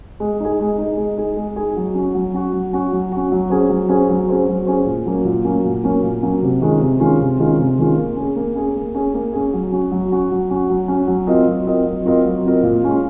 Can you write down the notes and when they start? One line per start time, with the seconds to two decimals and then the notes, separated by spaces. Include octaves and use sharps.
0.20 G#3
0.40 D#4 G#4
0.60 G#3
0.78 D#4 G#4
0.97 G#3
1.18 D#4 G#4
1.37 G#3
1.56 D#4 G#4
1.76 F#3
1.94 C#4 F#4
2.15 F#3
2.34 C#4 F#4
2.53 F#3
2.73 C#4 F#4
2.92 F#3
3.12 C#4 F#4
3.32 F#3
3.50 C#4 G#4 C5
3.69 F#3
3.89 C#4 G#4 C5
4.09 F#3
4.29 C#4 G#4 C5
4.48 F#3
4.66 C#4 G#4 C5
4.86 A#2
5.05 F#3 A#3 C#4
5.25 A#2
5.44 F#3 A#3 C#4
5.65 A#2
5.83 F#3 A#3 C#4
6.03 A#2
6.22 F#3 A#3 C#4
6.43 C3
6.62 D#3 G#3 C#4 F4
6.80 C3
7.00 D#3 G#3 C#4 F4
7.20 C3
7.39 D#3 G#3 C#4 F4
7.59 C3
7.78 D#3 G#3 C#4 F4
7.98 A#3
8.16 C#4 G#4
8.36 A#3
8.55 C#4 G#4
8.76 A#3
8.95 C#4 G#4
9.14 A#3
9.33 C#4 G#4
9.53 F#3
9.72 C#4 F#4
9.91 F#3
10.12 C#4 F#4
10.31 F#3
10.50 C#4 F#4
10.70 F#3
10.88 C#4 F#4
11.08 F#3
11.27 C4 F4 A#4 D#5
11.47 F#3
11.66 C4 F4 A#4 D#5
11.85 F#3
12.06 C4 F4 A#4 D#5
12.25 F#3
12.45 C4 F4 A#4 D#5
12.63 A#2
12.84 G#3 C#4 F4